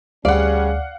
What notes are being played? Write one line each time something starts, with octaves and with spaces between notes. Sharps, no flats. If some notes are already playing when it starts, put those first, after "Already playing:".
D2 G3 C#4 G#4 D5 F5 F#5